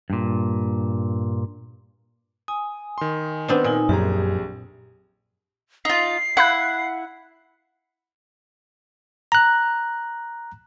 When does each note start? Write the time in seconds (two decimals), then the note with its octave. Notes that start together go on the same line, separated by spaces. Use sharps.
0.10 G2 A#2
2.48 G#5 D#6
2.98 D#3 C6
3.48 B3 C4 D4
3.64 A#2 D#4 G#5
3.89 A#1 F#2 G4 G#4 A#5
5.85 D#4 F4 C7
6.37 E4 F5 F#5 B5 F#6
9.32 A#5 F#6